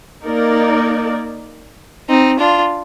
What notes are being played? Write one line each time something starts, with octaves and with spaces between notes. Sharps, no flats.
A#3 D#4 A#4 D5
C4 D#4
D4 F4